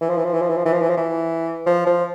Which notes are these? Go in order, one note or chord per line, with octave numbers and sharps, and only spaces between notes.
E3
F3
E3
F3
E3
F3
E3
F3
E3
F3
E3
F3
E3
F3
F3